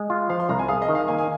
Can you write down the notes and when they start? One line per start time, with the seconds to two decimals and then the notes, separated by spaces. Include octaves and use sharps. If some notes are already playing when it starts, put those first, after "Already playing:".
Already playing: G#3
0.10 F4
0.30 F3 F5
0.40 C6
0.49 C2 A#5
0.59 G#5
0.68 G#4 F5
0.82 D#5
0.89 D#3
0.95 F5
1.08 A#3 G#5
1.18 G#5